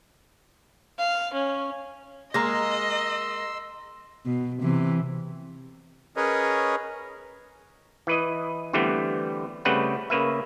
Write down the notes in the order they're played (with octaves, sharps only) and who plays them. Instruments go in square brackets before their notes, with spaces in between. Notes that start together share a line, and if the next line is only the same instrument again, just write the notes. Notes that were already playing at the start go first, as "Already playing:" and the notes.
[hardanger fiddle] F5
C#4
[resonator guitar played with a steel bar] G#3 A#3 [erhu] D#5 [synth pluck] A#5 A#6 [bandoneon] C6 E6
[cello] B2
C3 E3
[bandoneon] C#4 G#4 A#4 B4 C#5 D#5
[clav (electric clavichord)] E3 B4 D#5
D3 E3 G3 A3 B3 C4
C#3 G3 A3 C4 B4 F#5
C#3 A#3 B4 E5